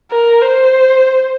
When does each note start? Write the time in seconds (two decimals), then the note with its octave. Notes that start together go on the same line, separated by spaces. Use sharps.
0.11 A#4
0.42 C5